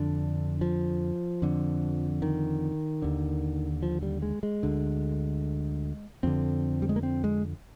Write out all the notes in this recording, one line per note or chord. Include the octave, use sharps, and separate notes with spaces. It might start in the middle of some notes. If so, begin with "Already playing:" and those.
Already playing: F2 D3 D4
F3
F2 D3
D#3
D#2 D3
F3
G3
G#3
G#3
D2 D3
F2 D3 C4
G3
G#3
A#3
C4
G#3